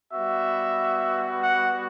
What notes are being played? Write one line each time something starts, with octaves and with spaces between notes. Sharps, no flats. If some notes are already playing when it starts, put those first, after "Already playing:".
G3 B3 F#4 E5
F#5